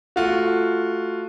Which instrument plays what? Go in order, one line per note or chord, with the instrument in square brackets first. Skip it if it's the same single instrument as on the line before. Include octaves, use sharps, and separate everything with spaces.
[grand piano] A3 F4 F#4